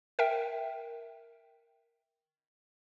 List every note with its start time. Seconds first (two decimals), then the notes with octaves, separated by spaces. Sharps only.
0.19 A#4 E5 G5